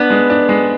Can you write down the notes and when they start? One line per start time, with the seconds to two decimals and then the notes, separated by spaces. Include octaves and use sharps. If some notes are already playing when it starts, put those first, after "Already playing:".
Already playing: B3 D4
0.10 G#3
0.30 D4
0.49 G#3